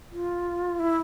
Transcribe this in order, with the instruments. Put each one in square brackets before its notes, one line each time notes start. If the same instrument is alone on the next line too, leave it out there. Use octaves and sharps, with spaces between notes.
[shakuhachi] F4
E4